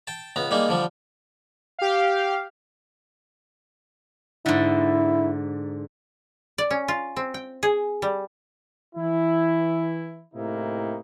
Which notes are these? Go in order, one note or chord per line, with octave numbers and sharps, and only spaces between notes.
G5 A5
C#2 B3 A#5
G3 G#3 A#3 D#4
D3 F3 G3
G4 F5
G#2 D3 E4
D5
C#4
F4
C4
G5
G#4
G3
E3 E4
A2 C3 A#3 D#4 E4